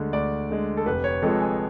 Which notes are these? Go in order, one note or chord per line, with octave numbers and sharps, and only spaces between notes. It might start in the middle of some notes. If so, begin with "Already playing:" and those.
Already playing: D2 D3 G#3
D2 D5
D3 G#3
A4
F1 B4
C#5
F2 F3 G#3 A4
G#5